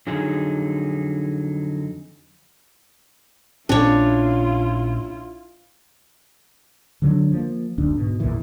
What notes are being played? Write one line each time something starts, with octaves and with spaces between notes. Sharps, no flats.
F2 D3 F#3 D#4 G#4
A#1 A#2 C#4 D4 E4 F4 C#5
D3 F#3 G#3 D4
F3 A#3
F#1 D2 D4
G#2 B2
A#1 E2 A#2 E3